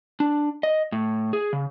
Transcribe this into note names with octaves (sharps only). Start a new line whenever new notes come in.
D4
D#5
A2
G#4
C#3